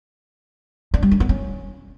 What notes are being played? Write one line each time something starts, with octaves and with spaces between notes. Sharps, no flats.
D4
G3
D4
B3
C#4